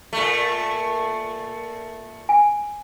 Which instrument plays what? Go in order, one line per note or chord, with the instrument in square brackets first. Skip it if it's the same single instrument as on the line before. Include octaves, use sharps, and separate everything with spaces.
[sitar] A#2 A3
[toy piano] G#5